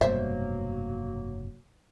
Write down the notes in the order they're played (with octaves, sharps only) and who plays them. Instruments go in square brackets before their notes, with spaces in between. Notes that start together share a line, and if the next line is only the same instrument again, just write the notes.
[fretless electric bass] F1 G2 B2 [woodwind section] F#3 A#3 [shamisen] C5 E5